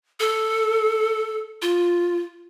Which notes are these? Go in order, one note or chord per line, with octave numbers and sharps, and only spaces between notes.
A4
F4